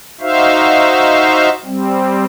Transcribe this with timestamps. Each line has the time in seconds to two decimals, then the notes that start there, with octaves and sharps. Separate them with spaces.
0.21 D#4 F#4 C5 E5 F5
1.65 G3 C4